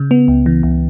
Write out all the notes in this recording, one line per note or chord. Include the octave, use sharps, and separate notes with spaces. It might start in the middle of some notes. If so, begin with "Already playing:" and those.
Already playing: C#3
B3
C#2
E3
C#2